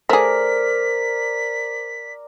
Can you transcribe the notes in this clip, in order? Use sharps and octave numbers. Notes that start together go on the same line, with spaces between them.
A3 G#4 A#4 C5 D5 B6